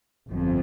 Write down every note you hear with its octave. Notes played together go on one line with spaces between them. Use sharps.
G1 F2